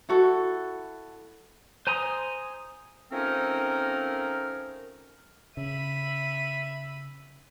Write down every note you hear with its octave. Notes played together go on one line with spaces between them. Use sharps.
E4 F#4 A4
C5 G#5 A#5 C6 D#6
F3 A3 C4 C#4 D#4 A#4
C#3 E5 B5 D#7